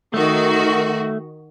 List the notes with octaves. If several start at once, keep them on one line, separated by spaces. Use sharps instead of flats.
D#3 A3 F#4